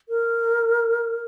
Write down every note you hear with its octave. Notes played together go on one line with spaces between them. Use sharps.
A#4